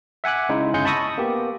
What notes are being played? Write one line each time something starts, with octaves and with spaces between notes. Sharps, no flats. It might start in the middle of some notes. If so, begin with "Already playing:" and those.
E5 F#5 G#5 D6 F#6
C#3 G#3 D#4 E4
G1 C#3 G#3 G#4 G6 C#7
A5 B5 C#6 D#6 E6 A#6
A#3 B3 G4